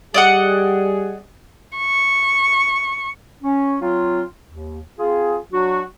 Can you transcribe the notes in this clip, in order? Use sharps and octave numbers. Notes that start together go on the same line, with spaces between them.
G3 G4 G#4 D5 D#5 F#5
C#6
C#4
F#3 C4 F4
D#2
C4 F4 G#4
F#3 D4 F#4